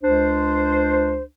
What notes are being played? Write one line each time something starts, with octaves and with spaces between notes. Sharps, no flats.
C#2 D4 C5